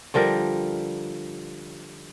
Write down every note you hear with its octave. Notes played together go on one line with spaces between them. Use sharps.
D3 F3 G3 A#4